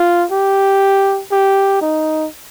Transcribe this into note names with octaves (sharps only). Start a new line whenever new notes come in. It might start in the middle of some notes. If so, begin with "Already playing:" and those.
Already playing: F4
G4
G4
D#4